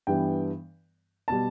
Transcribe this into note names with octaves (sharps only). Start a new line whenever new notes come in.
G2 E3 G3 B3 G5
B2 G3 A5